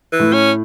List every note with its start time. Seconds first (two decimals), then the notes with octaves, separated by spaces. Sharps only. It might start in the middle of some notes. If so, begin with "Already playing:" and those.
0.12 E3
0.19 A2
0.33 C#4